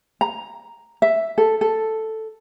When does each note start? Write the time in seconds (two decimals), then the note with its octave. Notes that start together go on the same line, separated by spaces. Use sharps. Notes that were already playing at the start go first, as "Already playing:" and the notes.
0.21 A#5
1.02 E5
1.38 A4
1.61 A4